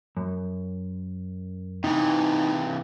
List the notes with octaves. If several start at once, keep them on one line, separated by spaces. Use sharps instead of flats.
F#2
C3 E3 D#4